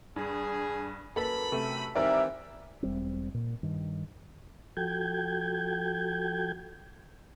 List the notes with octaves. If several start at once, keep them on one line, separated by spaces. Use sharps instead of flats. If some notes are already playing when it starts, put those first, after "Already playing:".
G2 G#4
F#2 A#3 A4 B4 B5
C3 A3
D#3 E3 G3 C4 G4 A#4 D5 E5
E1 G3 C4
A#2
G2 D#3
F3 F#4 A4 G5 G6 G#6